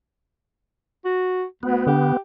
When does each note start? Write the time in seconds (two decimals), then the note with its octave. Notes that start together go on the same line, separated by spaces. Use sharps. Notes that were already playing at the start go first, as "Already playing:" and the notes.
1.05 F#4
1.63 D2 B3
1.87 D3 G4